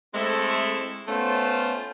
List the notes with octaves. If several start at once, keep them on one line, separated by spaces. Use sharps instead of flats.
G#3 A3 C4 E4 A4
A3 B3 C#4 F4 C5